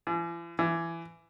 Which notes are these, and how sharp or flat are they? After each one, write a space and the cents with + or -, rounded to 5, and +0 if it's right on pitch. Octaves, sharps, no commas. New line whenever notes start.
E3 +45
E3 +20